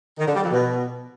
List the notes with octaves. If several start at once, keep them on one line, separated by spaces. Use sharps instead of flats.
D#3
D3
G3
F2
B2